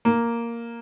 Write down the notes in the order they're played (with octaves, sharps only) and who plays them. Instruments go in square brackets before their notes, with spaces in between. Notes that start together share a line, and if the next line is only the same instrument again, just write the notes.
[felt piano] A#3